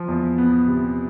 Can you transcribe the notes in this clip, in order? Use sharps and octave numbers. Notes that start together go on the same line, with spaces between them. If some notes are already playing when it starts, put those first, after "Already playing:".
Already playing: F3
E2
B3
C3